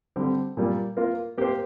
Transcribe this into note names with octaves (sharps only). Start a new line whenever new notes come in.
D3 G3 C4 G4
A#2 G3 A#3
A#3 F4 A#4
A#3 G4 C5